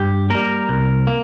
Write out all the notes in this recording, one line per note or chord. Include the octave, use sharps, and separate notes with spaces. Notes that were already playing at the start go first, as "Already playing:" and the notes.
Already playing: G2 G4
G3 A#3 A#4
C2
A#3